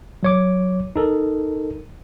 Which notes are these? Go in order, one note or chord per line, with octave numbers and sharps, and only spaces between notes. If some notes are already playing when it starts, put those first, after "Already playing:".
F#3 C#5 D6
D#4 A4 A#4